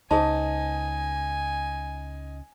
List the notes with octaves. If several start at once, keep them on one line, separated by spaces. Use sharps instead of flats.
C#2 D#4 G#4 C5 G#5 A5